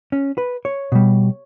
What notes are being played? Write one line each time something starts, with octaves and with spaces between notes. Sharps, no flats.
C#4
B4
C#5
B2 G3